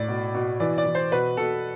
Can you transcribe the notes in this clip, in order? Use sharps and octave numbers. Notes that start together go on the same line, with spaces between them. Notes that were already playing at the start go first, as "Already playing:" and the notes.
Already playing: A2 D5
B2
B2
E3 D5
D5
E3
C5
B2 B4
B2 A4